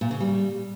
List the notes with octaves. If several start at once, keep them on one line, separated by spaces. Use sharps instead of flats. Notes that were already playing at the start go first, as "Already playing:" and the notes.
A#2
C#3
G3